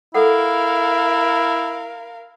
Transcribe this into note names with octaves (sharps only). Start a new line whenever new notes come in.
E4 A4 A#4 F5 F#5